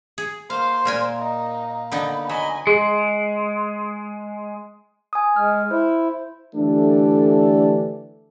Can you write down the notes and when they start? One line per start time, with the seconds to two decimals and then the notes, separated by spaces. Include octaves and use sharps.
0.18 G#4
0.50 A#3 C5 F5
0.85 A#2 A#4 G#5
1.19 D#4
1.92 D3 B3 D#4 B5
2.29 F#3 D#5 G#5 B5
2.67 G#3 G#4
5.13 G#5 D#6
5.36 G#3 F6
5.71 E4 C5
6.54 D3 E3 A3 D4 G4 A4